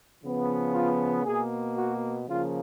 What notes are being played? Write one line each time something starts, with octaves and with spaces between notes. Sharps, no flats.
C#3 F3 B3
F4
B2 A#3 G#4
F#4
C#3 F3 A#3 F4